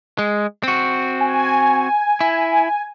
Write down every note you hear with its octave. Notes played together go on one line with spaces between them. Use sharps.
G#3
C4 F#4
G#5
E4